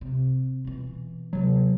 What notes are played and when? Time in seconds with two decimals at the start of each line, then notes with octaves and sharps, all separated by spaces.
0.01 C3
0.65 B2 E3
1.33 C3 F#3 G#3